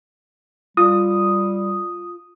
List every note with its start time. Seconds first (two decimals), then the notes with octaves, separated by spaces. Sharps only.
0.77 G3 F4 D#6